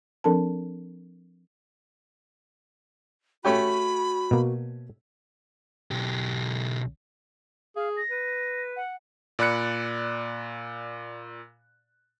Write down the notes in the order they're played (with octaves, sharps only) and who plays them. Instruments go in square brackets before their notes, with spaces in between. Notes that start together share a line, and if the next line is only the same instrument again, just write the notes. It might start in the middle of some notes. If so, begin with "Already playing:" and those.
[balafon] F3 C4 D4 A4 A#4 A5
[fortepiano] A3 C#4 G4 [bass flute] F#4 [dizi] B5
[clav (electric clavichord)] B2 A#3
[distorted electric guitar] B1 G4
[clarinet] G#4 [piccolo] F5
[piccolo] A#6
[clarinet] B4
[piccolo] F#5
[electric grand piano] A#2 D5 B5 F#6 C#7